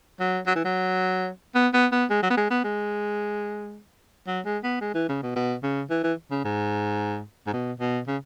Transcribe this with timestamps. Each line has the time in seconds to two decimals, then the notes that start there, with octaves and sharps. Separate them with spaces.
0.20 F#3
0.47 F#3
0.55 E3
0.65 F#3
1.55 B3
1.74 B3
1.92 B3
2.10 G#3
2.23 F#3
2.30 B3
2.37 G#3
2.50 B3
2.64 G#3
4.27 F#3
4.45 G#3
4.63 B3
4.81 G#3
4.94 E3
5.09 C#3
5.23 B2
5.35 B2
5.63 C#3
5.90 E3
6.03 E3
6.31 C#3
6.44 G#2
7.47 G#2
7.53 B2
7.80 B2
8.07 C#3